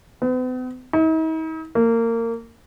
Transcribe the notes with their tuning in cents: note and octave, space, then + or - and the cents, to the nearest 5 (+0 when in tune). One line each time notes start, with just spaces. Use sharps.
B3 +45
D#4 +45
A#3 -25